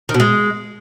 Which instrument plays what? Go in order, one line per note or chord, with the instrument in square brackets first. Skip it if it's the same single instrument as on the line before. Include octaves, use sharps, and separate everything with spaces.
[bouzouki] D#3
B2
G#3